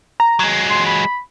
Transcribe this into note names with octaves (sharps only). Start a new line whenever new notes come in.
A#5
F#3 G#3
C6
B5